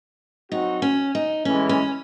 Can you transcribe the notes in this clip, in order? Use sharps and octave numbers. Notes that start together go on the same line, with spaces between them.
F#3 C4 D#4 F#4
C#4
D#4
A2 E3 G#3 C#4
C#4